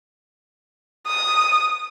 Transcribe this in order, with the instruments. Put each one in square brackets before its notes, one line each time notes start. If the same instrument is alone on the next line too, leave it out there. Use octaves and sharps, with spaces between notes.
[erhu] D#6